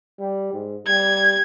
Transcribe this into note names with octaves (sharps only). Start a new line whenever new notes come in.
G3
G#2
G3 G#6